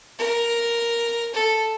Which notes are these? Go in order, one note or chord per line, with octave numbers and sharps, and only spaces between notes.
A#4
A4